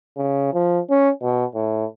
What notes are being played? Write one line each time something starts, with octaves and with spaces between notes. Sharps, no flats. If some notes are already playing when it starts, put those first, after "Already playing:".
C#3
F3
C#4
B2
A2